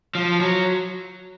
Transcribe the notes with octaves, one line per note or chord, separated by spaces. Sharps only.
F3
F#3